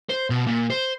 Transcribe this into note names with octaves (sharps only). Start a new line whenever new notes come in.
C5
B2
A#2
C5